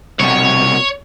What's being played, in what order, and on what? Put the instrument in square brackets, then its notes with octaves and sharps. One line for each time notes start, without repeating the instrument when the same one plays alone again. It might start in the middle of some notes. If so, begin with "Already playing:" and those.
[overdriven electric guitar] C2 B2 [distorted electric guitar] C#5